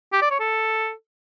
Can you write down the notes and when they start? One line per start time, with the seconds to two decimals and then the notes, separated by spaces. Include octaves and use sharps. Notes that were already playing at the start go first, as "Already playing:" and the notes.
0.13 G4
0.22 D5
0.31 C#5
0.40 A4